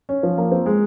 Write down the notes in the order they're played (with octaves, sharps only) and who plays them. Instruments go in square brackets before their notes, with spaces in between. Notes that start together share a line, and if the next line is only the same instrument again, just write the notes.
[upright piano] C#4
F3
A#3
C4
G#3